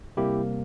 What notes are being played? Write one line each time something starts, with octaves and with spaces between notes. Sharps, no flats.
C3 G3 A#3 E4 G4